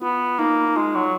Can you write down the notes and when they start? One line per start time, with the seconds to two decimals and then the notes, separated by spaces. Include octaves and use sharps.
0.02 B3 F4
0.39 A#3 D#4
0.67 D#4
0.76 G#3 F4
0.95 F#3